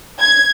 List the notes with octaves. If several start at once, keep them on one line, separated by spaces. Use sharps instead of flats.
G#6